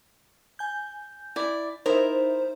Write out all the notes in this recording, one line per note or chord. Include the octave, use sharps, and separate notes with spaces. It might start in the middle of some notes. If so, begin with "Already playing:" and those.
G#5 G6
E4 D5
D#4 E4 A#4 C5 E5